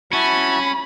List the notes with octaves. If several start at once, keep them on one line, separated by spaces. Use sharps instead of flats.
C#4 E4 F#4 A5 B5